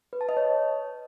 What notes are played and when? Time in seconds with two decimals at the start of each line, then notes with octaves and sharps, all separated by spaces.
0.13 B4
0.21 A5
0.29 D#5
0.37 C#5